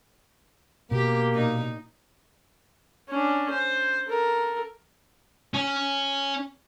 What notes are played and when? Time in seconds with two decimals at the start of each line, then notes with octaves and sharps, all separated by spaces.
0.91 B2 A#3 G4
1.33 A#2 D#4
3.09 C#4 D4
3.51 C5
4.07 A4 A#4
5.54 C#4